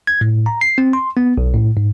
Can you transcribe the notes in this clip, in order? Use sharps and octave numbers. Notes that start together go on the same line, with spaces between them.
G#6
A2
A#5
C7
C4
C6
B3
B1
A2
G#2